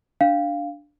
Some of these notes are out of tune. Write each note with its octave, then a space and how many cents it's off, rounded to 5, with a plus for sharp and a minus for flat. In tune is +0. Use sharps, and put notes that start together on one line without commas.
D4 +0 F5 +0